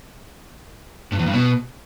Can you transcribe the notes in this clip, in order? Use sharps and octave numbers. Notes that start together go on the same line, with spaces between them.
G2
E2
G2
B2